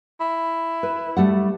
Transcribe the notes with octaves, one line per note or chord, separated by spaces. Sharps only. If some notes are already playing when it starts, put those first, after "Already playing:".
E4
B4
G3 A3 F#5